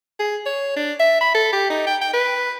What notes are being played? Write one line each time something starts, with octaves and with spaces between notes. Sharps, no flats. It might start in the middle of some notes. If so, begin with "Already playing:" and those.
G#4
C#5
D4
E5
B5
A4
G4
D#4
G5
G5
B4